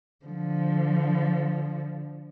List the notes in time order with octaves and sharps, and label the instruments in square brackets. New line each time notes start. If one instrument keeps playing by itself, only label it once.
[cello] D3 F3